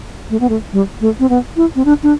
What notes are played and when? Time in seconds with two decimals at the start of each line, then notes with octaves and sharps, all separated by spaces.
0.30 A3
0.40 B3
0.49 A3
0.73 G3
1.01 A3
1.20 C4
1.29 B3
1.57 E4
1.76 C4
1.85 D4
2.03 D4